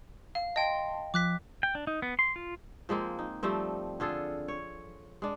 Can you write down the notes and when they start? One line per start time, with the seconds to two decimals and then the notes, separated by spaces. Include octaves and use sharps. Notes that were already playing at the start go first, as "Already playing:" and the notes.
0.35 F5
0.56 D#5 G5 A5 C6
1.14 F3 D6 F#6 B6
1.63 G5
1.75 D4
1.87 D#4
2.02 B3
2.19 C6
2.36 F4
2.89 F3 G#3 A#3 C4
3.19 D#4
3.43 F3 G3 A3 C4
4.00 D3 F4 G#4 A4
4.48 C#5
5.22 G#3 D4